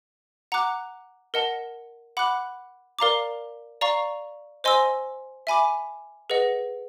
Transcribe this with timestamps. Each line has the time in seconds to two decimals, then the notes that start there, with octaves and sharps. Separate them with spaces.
0.52 F#5 A#5 D6 F#6
1.34 A#4 D#5 F#5 A5
2.17 F#5 B5 D6 F#6
2.99 A#4 D5 F5 A#5 D6
3.81 D5 F5 A#5 C#6
4.64 C5 D#5 G#5 C6 E6
5.47 E5 G#5 B5 D6
6.30 G#4 B4 D#5 F#5